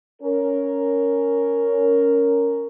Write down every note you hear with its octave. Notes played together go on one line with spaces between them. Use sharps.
C#4 A#4